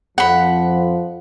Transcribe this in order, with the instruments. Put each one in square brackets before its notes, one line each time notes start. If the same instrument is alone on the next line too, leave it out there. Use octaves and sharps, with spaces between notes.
[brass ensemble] F2 F3 [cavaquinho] F#5 B5